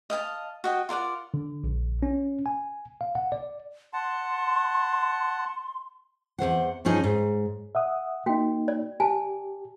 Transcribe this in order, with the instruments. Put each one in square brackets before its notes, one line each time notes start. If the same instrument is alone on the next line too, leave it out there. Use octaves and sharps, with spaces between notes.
[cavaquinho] D#5 F5 G#5 A5
F#4 D#5 G5
F4 A#4 D5 F#5
[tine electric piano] D3
A#1
C#4
G#5
F5
F#5
D5
[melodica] F#5 A5 [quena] C6
[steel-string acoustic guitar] E2 F3 C5 F#5
G2 F3 C#4 D#4 G#4
G#2
[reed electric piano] E5 F#5 D#6
[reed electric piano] A#3 D#4 [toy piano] F#4 G5
[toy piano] D5
[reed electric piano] G4 [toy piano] G#5 A5